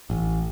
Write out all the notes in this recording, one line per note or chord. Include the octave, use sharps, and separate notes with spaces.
A1